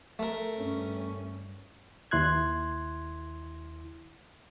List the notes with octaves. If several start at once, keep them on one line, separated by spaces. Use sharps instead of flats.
A3 A#4
G2 C#4
D#2 E4 C6 F#6 G#6